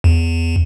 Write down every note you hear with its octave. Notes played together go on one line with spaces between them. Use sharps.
E2